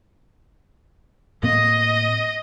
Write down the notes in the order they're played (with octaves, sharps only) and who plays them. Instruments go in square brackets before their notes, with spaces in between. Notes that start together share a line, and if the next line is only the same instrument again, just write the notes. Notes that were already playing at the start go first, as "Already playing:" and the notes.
[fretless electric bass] A2 A#3 C4 [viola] D#5